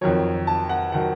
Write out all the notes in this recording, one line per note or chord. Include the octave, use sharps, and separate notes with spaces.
F2 D#3 F#3 C#5
A5
F#5
D#3 F#3 F#5